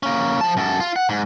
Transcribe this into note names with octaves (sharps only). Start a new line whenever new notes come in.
A#3 C#4
F3 A5
F#2 A4
F4
F#5
G#2